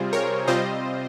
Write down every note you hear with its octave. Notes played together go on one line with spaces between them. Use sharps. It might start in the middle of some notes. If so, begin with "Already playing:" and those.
Already playing: C3 G3 C4 F4 G#4 C5
A#4 C#5
C3 G3 C4 F4 C5 D#5